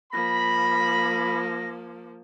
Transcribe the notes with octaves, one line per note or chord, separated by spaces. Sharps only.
F3 A#3 B5 A#6